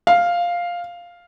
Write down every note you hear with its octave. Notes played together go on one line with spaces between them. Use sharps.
F5